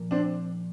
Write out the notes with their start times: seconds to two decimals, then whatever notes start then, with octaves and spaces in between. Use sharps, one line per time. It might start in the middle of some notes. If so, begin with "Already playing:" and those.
Already playing: A#2 F3 A#3
0.11 C4 D4